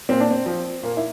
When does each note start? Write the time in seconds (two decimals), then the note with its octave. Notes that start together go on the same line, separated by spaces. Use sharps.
0.09 A#2 C4
0.20 D4
0.31 C4
0.46 F3
0.83 A#2 A#3
0.97 E4